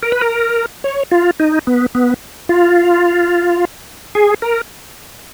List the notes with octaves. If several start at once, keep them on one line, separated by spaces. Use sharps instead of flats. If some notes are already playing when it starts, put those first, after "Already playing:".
A#4
B4
A#4
C#5
F4
D#4
B3
B3
F4
G#4
A#4